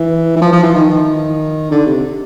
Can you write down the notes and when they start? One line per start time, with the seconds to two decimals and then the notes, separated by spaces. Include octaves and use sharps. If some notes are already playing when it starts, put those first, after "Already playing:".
Already playing: E3
0.36 E3
0.42 F3
0.52 F3
0.63 E3
0.74 D#3
0.90 D#3
1.71 D3
1.86 C3